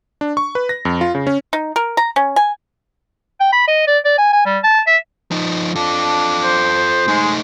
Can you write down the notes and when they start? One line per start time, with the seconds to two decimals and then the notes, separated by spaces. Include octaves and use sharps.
0.21 D4
0.37 C#6
0.55 B4
0.69 A#6
0.85 F2
1.01 F4
1.15 C#3
1.27 C#4
1.53 D#4
1.76 A#4
1.97 A#5
2.16 C#4
2.36 G#5
3.40 G5
3.53 B5
3.67 D#5
3.87 D5
4.05 D5
4.18 G#5
4.33 G#5
4.46 G3
4.63 A5
4.87 E5
5.31 F3 D#4
5.76 D4 F4 A4
6.43 C5
7.08 G#3 A3 D#4